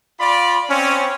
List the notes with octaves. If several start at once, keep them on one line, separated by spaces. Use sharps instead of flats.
F4 D5 B5
C4 C#4